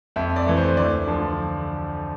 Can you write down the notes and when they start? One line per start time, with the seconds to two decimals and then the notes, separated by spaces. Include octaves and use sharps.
0.16 F2 E5
0.36 D5
0.46 E3 A3
0.57 C5
0.77 D2 D5
1.07 D3 F3